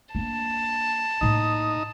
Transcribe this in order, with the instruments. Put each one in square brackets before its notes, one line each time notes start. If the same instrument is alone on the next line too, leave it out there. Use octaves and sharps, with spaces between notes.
[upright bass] A#3 D4 [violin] A5
[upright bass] A2 A#3 [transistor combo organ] D#4